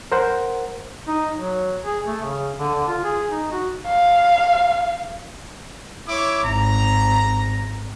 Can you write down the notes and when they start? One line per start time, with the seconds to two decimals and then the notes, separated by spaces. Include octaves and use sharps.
0.12 A#4 C5 F#5
1.08 D#4
1.35 F#3
1.84 G#4
2.07 A3
2.22 C#3
2.60 D3
2.75 D3
2.88 F4
3.04 G#4
3.31 D#4
3.52 F#4
3.87 F5
6.07 E4 C#5 D6
6.44 G#1 A#5